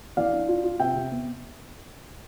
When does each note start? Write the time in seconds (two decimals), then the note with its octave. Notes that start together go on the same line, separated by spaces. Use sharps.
0.17 E3 D5 F5
0.32 D4
0.48 F4
0.64 F4
0.79 C3 E5 G5
0.96 C3
1.11 B3